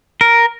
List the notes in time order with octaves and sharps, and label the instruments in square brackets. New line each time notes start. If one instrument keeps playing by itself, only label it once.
[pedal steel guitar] A#4